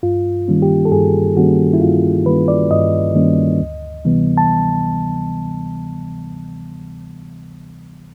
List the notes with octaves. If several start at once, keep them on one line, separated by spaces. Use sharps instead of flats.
G2 F4
D#3 G3 A#3 C#4
G4
A4
G2 G#4
D#3 G3 A#3 C#4 F#4
E4
G2 F4
D#3 G3 A#3 C#4 B4
D5
G2 D#5
D#3 G3 A#3 C#4
D2
C3 E3 G3 B3
A5